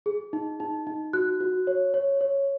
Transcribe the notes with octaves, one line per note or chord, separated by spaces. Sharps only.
G#4
D#4
D#4
D#4
F#4 F#6
F#4
C#5
C#5
C#5